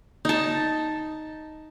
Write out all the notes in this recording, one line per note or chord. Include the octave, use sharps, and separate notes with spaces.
D#4 A5